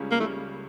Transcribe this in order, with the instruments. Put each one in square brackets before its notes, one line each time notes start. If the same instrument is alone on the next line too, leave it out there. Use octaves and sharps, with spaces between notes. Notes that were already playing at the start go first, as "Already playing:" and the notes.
Already playing: [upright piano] C#2 C#3 G3 C#4
[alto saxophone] A#3
[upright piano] C#3 G3 C#4 [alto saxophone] A3